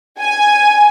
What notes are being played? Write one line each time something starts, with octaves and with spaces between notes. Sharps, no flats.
G#5